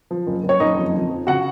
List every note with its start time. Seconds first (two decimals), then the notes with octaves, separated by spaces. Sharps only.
0.11 F3
0.27 F#1
0.43 F#1
0.49 C#5
0.60 F#1 D#4 D#5
0.77 F2
0.94 F2
1.10 F3
1.27 C#3 F#4 F#5